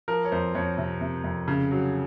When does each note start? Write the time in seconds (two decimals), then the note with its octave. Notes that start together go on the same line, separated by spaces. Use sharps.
0.08 F3 A#4
0.25 C#5
0.32 F2 C5
0.55 F2 C#5
0.78 C3
1.01 C3
1.24 F2
1.48 C#3
1.71 F#3